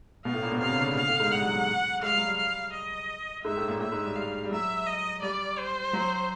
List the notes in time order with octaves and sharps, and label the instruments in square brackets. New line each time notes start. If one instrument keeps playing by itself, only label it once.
[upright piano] B2 B3 [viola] F5
[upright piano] A2 A3
A#2 A#3
B2 B3
[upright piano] C3 C4 [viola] F5
[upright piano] C#3 C#4
D3 D4
C#3 C#4
[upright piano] B2 B3 [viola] F5
[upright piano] A2 A3
G#2 G#3
[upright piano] G#3 [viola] F#5
[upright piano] G3
F#3
G3
[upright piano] G#3 [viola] F5
[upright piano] G3
F#3
G3
[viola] F5
D#5
[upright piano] G#2 G#3 [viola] E5
[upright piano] A2 A3
A#2 A#3
[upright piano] A2 A3 [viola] E5
[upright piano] G#2 G#3
G3
[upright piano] G3 [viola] F5
[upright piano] G3
[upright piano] F#3 [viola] E5
[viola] D#5
[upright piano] G3 [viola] D5
[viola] C5
[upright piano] F#3